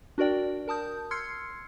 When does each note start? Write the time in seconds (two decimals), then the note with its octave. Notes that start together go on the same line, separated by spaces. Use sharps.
0.18 D4 F#4 A#4 D5 G5
0.68 A#4 A5 D#6 G6
1.11 C6 E6 F6 G#6 C7 C#7